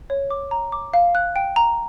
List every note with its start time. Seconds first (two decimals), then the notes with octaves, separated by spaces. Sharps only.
0.10 C#5
0.30 D6
0.51 A#5
0.72 D6
0.94 F5
1.15 F#6
1.36 G5
1.56 A#5